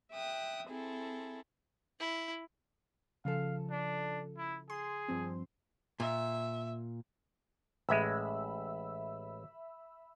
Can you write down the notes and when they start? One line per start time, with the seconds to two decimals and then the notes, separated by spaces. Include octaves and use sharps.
0.12 E5 G5 D#6 F#6
0.70 C4 E4 G#4 A4
1.99 E4
3.25 C#3 F3 A4 F5
3.71 D4
4.38 E4
4.70 G#4 C6
5.08 G2 F3 C4
6.00 A#2 E5
7.89 A1 G#3 E5 B5 E6